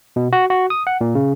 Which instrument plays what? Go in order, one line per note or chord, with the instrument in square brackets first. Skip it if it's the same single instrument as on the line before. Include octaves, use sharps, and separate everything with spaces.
[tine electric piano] B2
F#4
F#4
D#6
F#5
A#2
C#3